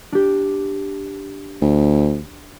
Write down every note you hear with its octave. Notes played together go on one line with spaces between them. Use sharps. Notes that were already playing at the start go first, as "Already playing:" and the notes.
D4 G4
D2